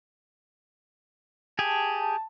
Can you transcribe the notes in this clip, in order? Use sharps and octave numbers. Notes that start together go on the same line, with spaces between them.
G4 G#4 A5